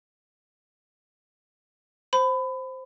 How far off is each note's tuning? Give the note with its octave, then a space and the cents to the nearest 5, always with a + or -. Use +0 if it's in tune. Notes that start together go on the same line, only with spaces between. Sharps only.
C5 +0 B5 +25